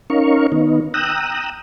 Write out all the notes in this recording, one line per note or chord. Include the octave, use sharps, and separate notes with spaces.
C#4 D#4 A#4 F5 C#6
D#3 B3 D#4
G5 A#5 D#6 E6 F#6